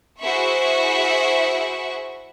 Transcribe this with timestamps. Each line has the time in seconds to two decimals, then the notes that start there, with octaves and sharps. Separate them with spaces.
0.20 E4 F#4 G#4 C5 E5 C#6